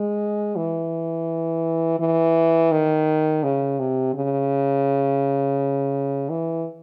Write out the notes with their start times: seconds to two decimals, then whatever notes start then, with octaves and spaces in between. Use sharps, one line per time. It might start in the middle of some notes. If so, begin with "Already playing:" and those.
Already playing: G#3
0.56 E3
2.00 E3
2.72 D#3
3.43 C#3
3.80 C3
4.14 C#3
6.30 E3